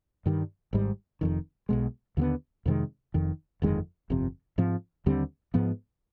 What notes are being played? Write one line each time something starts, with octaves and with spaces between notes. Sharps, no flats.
G2 D#3 G3
G#1 G#2 G3
F1 F2 D#3
B1 B2 G#3
D#2 D3 G3 B3
F2 C3 D#3 G#3
F1 F2 D#3
G1 F2 D#3 G#3
G1 F2 C3
G#2 F3 C4
D#2 D3 G3 C4
G#2 F3 B3